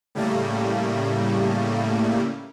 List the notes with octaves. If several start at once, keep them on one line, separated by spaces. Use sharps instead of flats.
A2 C#3 G3 A3 A#3